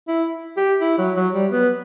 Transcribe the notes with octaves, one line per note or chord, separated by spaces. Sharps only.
E4
G4
E4
F#3
F#3
G3
B3